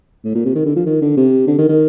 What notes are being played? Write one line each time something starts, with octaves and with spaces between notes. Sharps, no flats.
A2
A#2
C3
D#3
D3
F3
D#3
D3
C3
D3
D#3
D#3